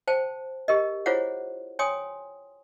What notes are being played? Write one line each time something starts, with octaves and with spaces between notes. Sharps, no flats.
C5 G5 A5
G4 A#4 D#5
E4 F4 G#4 C5 C#5 F#5
C#5 G5 G#5 C6 D#6